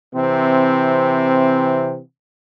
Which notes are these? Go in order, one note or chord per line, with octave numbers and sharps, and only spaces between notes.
C3 E3 C4